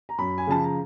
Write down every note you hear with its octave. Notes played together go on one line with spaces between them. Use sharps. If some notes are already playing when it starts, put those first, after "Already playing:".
A#5
F#2 B5
G#5
C#3 F3 A5
A#5